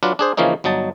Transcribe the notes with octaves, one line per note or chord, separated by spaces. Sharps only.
F#3 D4 F4 B4
D4 G#4 C5
C#3 E3 F3 A#3 C#4 D#4
G1 F#3 D#4 A5